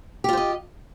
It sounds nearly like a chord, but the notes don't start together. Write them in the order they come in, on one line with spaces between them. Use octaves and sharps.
G4 F4 C5 D#5